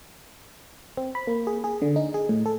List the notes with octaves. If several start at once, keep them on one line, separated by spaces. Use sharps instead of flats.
C4
B5
A#3
G#4
G#4
D3
D#4
G#4
A2
A4